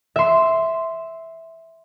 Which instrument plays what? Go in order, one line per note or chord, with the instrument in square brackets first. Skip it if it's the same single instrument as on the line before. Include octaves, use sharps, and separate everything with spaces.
[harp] E5 C6